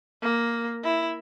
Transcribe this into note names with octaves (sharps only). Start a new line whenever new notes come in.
A#3
E4